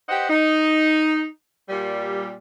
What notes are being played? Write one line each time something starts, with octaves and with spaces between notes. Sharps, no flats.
G4 B4 C5 D#5 F#5
D#4
A#2 G3